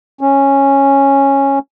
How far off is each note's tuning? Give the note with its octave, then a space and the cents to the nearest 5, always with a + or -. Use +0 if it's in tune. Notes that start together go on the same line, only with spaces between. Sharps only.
C#4 -10